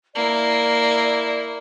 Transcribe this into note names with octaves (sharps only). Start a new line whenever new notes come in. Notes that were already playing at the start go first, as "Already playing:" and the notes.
A#3 E4 D5